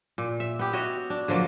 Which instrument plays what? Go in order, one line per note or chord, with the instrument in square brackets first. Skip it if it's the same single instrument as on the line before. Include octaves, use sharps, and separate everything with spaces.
[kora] A#2
E5
B3 G4
F#4 C#5 D#5 E5
D4
D3 F3 F#3 A#3